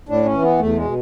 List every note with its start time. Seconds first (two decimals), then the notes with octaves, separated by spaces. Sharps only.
0.09 A2 D4
0.25 C#4
0.34 E3
0.42 B3
0.59 E2 A3
0.76 G#3
0.85 B2